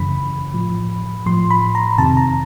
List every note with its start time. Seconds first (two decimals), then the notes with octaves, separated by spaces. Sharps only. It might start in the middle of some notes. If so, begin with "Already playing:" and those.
Already playing: F#2 C#3 E3 B5
0.54 A2 F3
1.26 A2 F3 C6
1.50 B5
1.75 A#5
1.98 F2 C3 D#3 A5
2.17 A#5